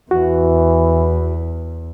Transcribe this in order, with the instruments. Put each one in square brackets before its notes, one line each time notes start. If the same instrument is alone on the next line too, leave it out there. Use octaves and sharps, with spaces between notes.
[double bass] E2 [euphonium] E3 [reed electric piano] F#4